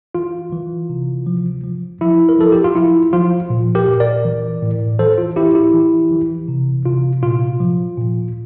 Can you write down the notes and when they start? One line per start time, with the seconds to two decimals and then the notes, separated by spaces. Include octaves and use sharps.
0.15 E3 F4
0.52 E3
0.89 C3
1.26 F3
1.64 F3
2.01 F3 E4
2.29 A#4
2.38 F3 A4
2.52 G4
2.64 F4
2.75 F3 E4
3.13 F3 F4
3.50 A#2
3.75 G4 A#4
3.88 A#2
4.00 A#4 D5
4.25 E3
4.62 A2
4.99 E3 A4 C5
5.18 F4
5.36 A2 E4 G4
5.55 E4 G4
5.74 E3
6.11 E3
6.48 C3
6.86 C3 F4
7.23 A#2 F4
7.60 F3
7.98 A#2